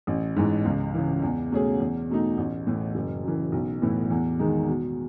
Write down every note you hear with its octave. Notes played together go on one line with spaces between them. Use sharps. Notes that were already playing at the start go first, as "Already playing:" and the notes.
A1
G#2 E3
C#2
C#3 E3
E2
B2 A3 C#4 G#4
E2
B2 A3 D#4
A1
A2 E3
F#1
F#2 E3
B1
A2 E3 B3 E4
E2
D#3 G#3 D#4
B2